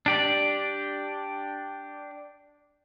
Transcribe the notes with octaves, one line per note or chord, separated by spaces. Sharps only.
D4 G4 D5